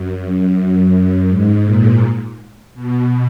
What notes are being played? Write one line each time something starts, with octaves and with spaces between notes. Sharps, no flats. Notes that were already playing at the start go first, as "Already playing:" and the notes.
Already playing: F#2
F#2
F#2
G#2
A#2
B2